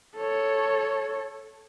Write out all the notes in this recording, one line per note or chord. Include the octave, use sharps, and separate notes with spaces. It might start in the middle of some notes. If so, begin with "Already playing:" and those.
A4 C#5